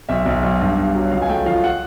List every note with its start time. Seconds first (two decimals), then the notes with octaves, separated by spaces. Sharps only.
0.09 B1 E5
0.26 B1
0.43 B1
0.61 G2
0.77 G2
0.95 F#3
1.12 C#2 F5
1.22 G#5
1.29 A3 G5
1.46 F3 F5
1.64 F#5